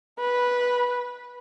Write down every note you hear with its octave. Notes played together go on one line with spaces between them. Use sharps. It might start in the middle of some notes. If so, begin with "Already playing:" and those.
B4